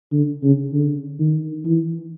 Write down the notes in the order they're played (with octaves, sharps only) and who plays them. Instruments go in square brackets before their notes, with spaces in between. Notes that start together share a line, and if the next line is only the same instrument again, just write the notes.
[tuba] D3
C#3
D3
D#3
E3